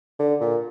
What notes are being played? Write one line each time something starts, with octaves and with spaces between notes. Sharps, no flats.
D3
A#2